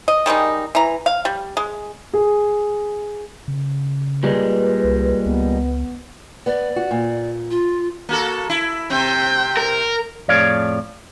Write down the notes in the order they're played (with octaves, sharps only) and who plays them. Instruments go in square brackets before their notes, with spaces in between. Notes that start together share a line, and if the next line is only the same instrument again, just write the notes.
[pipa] D#5
D#3 G3 G#3 D#4
E3 A#5
F5
G3
G#3
[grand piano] G#4
[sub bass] C#3
[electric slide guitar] A#2 G3 G#3 [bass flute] B4
[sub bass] C2
[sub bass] C#2 [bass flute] B3
[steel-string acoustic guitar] B3 [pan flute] D5
[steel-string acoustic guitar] F#4
A#2
[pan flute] F4
[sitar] A#3 F#4 A4
E4
[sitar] C3 C4 [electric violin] G5
[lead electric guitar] A#4
[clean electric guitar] F2 A2 G#4 C#5 D5 F5